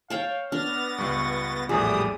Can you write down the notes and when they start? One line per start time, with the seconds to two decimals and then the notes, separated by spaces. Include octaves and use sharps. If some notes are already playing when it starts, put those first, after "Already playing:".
0.10 C#5 F5 G5 A5
0.52 B3 D4 F6 A6 A#6
0.98 C#2 G2 C#6
1.69 A#1 E2 A2 G3 G4 G#4 D5 D#6